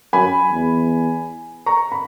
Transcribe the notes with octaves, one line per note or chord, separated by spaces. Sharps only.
F#2 G#5 B5
E2
A#5 C#6
B5